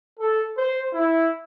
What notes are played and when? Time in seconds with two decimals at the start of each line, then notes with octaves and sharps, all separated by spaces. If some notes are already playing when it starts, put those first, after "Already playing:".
0.19 A4
0.57 C5
0.94 E4